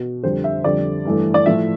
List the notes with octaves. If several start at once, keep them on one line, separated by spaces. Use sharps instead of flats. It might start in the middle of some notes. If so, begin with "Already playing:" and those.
Already playing: B2
F2 D3 G3 C5
E5
F2 D3 G3 D5
G2 E3 A3
D5
A2 F3 A3 E5